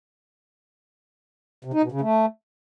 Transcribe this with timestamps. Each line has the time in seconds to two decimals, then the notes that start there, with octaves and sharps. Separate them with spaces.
1.65 C3
1.74 D#4
1.83 B2
1.92 C#3
2.01 A3